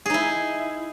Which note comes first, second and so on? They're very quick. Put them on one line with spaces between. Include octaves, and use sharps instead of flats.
G#4 D#4 E4